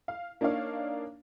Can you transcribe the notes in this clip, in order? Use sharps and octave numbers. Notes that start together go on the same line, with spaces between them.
F5
A#3 D4 D#4 C#5 F5